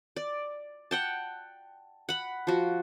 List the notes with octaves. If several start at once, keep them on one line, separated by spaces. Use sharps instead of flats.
D5
F#5 G5 A5
F#5 B5
F3 F#4